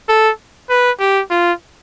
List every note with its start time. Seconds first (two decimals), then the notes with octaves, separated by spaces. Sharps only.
0.09 A4
0.70 B4
1.00 G4
1.31 F4